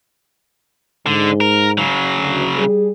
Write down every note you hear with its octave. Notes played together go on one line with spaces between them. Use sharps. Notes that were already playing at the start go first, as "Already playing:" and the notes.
G#2 D3
A#4
C#3 F#3
D2
G3 G#4